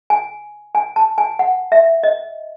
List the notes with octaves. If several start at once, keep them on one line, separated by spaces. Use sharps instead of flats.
G#5
G#5
A5
G#5
F#5
E5
D#5